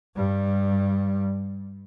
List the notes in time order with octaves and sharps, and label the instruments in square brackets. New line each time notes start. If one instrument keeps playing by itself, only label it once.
[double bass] G2 G3